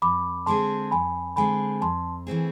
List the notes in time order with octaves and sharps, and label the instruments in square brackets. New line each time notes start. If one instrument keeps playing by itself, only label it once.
[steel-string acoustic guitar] F2 [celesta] B5 D6
[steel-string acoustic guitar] D3 G#3 C4 G#4 [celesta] A5 C6
[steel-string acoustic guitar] F2 [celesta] G#5 B5
[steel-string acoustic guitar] D3 G#3 C4 G#4 [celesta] G#5 B5
[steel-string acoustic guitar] F2 [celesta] A5 C6
[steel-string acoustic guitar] E3 A3 C4 G#4